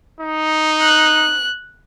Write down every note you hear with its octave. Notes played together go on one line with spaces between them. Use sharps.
D#4
F#6